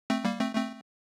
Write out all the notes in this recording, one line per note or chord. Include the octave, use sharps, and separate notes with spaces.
A3 C4
G3 A#3
A3 C4
A3 C4